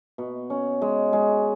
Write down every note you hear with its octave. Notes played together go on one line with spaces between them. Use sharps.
B2
C#4
G#3
G#3